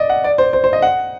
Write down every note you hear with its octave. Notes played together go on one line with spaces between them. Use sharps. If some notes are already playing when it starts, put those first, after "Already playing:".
Already playing: D5 D#5
F#5
D5
C5
C5
C5
D#5
F#5